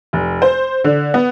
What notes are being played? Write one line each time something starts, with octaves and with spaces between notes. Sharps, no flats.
F1
C5
D3
B3